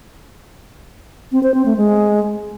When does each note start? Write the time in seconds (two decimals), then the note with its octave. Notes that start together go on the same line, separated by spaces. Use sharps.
1.32 C4
1.43 C5
1.54 C4
1.65 A3
1.77 G#3